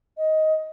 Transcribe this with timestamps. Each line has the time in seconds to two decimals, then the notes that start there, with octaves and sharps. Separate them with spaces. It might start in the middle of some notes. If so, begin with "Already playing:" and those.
0.17 D#5